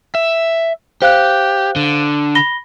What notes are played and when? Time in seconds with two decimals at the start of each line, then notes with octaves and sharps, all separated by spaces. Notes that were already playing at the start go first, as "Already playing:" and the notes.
0.15 E5
1.02 G4 C5 F5 F#6
1.76 D3
2.35 B5 A#6 G7